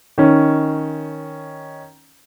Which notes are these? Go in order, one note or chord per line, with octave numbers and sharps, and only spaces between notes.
D#3 C#4